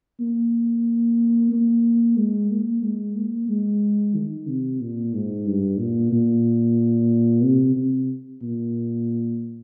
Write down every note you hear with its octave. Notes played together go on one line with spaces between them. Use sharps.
A#3
A#3
G#3
A#3
G#3
A#3
G#3
D#3
C3
A#2
G#2
G2
A#2
A#2
C3
C3
A#2